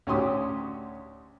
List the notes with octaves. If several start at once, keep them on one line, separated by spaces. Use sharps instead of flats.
D2 C#4 G4 C6 D#6